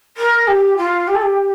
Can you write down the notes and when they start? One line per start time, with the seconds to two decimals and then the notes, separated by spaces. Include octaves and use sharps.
0.17 A#4
0.47 G4
0.77 F4
1.07 G4
1.14 A4
1.21 G4